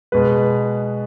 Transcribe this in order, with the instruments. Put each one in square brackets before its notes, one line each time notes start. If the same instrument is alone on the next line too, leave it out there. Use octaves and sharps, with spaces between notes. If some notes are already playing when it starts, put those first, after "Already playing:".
[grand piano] B2 G#3 B4